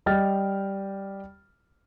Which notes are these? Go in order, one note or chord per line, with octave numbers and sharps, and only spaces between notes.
G3 D#5 G5 F6 A6